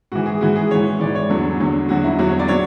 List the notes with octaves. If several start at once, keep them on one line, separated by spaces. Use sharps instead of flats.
G#2 E3 F#4
G#4
G#2 E3 F#4
G#4
G#2 E3 C#5
G#2 E3 D5
C#5
E2 D3 F#3 A4
E2 D3 F#3
E2 D3 F#3 F#4
E4
E2 D3 F#3 F#4
C#5
D5
F#3 C#5